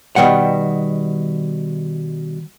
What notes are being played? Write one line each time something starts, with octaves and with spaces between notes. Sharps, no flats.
B2 D#3 G3 F#5